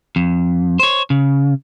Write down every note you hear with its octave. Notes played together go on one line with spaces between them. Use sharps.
F2
C5 C#5
C#3